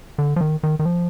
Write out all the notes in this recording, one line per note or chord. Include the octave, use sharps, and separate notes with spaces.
D3
F3
D#3
D#3
D#3
F3